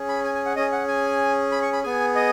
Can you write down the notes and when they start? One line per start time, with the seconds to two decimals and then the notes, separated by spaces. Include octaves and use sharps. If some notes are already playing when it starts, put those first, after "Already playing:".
Already playing: C#4 G#4
0.09 B5
0.24 G#5
0.35 G#5
0.45 F#5
0.56 C#4 G#4 D#5
0.72 F#5
0.88 G#5
1.52 B5
1.62 C#6
1.73 B5
1.84 B3 G#4 G#5
2.15 D#5